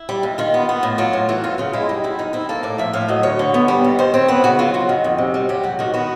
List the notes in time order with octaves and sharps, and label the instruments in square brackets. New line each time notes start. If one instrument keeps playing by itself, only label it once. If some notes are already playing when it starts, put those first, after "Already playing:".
Already playing: [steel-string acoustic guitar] E4
G3
D#2
D#3 F4
B3
B3
A2
F#3 F4
A2
E3 F#4
F#2 F4
C#3 F4
G#3 E4
G3 D#4
F#2 E4
D#3 D#4
C4 E4
A#3 A4
A2 D5
F3 E5
A2 F5
F#3 D#5
D2 C#5
D3
B3
G3
D#2
D#3 C5
C4 C#5
B3 B4
C#3 F#4
F#3 F4
C#3 F#4
D#3
F2
C3
G3
F#3 G4
G#2 F#4
D#3 F#4
B3 F#4